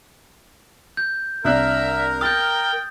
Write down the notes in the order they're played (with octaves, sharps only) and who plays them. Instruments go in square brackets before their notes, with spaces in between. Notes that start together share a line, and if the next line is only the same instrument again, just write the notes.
[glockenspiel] G6
[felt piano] C2 D4 F#6 [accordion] A#4 [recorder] E5
[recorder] G5 [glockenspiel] D#6 G6 [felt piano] F6 A6